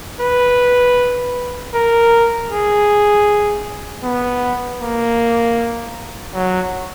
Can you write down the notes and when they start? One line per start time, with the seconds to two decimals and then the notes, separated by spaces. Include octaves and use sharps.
0.21 B4
1.75 A#4
2.51 G#4
4.04 B3
4.81 A#3
6.34 F#3